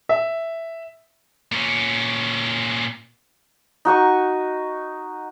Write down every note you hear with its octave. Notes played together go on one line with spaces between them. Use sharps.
E5
A#2 C#4
D#4 F#4 D#5 C#6